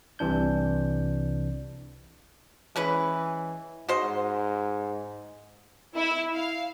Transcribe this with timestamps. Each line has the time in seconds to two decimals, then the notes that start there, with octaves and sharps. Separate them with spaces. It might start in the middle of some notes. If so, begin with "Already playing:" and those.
0.19 C2 C3 E3 D4 G6
2.76 E3 G#3 C#4 B4
3.89 G#2 F#4 C5 D#5
5.94 E4
6.34 F5